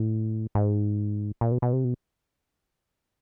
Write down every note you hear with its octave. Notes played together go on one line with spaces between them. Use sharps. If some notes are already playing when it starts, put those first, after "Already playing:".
Already playing: A2
G#2
A#2
B2
B2
C3
B2